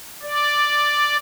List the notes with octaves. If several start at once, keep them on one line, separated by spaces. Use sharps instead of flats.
D5